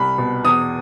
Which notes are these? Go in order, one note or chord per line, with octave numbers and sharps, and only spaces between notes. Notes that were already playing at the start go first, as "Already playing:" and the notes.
Already playing: C2 B5
B2
E2 D#6